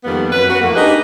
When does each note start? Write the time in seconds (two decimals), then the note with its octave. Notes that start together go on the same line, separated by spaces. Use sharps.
0.05 F2 D#3 G3 A#3 B3
0.33 F#2 B4
0.50 F#4
0.61 F2 A2 A3 A#3
0.76 D4 D#4 G4 G#4 B4 D#5